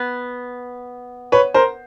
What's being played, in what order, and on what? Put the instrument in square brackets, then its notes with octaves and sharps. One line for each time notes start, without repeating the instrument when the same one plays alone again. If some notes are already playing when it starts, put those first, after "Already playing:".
Already playing: [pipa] B3
[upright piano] B4 C#5
A#4 C5